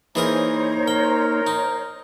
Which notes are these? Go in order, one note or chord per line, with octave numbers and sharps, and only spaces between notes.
E3 A#3 D#4 G#4 A#4 C5 C#5 A#5
A#4 G5
D#4